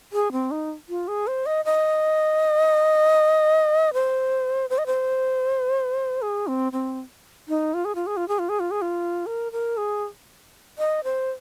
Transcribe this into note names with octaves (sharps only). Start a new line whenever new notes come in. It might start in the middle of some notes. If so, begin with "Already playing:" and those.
G#4
C4
D#4
F4
G#4
C5
D#5
D#5
C5
C5
D#5
C5
G#4
C4
C4
D#4
F4
G#4
F4
G#4
F4
G#4
F4
G#4
F4
G#4
F4
A#4
A#4
G#4
D#5
C5